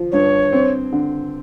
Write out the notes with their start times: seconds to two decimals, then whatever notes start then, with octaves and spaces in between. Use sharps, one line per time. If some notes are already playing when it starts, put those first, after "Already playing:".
Already playing: F3
0.12 G2 C#5
0.52 C4
0.92 D3